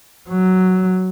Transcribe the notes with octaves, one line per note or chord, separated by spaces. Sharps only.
F#3